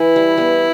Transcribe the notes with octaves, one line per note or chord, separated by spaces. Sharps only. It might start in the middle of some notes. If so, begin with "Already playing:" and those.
Already playing: E3 E4
G3
G3 B3